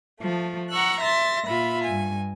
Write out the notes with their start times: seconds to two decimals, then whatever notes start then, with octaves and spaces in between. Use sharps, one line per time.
0.20 F3 A3
0.70 F#5 A#5 C#6 E6 F#6
1.01 E5 C6 A6 A#6
1.48 A#2 F4 E5 B5
1.84 G2 G#5